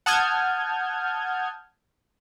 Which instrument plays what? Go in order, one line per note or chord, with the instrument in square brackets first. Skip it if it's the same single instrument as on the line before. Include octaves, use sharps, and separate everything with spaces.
[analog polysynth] F#5 A5 D#6 F6 G6 G#6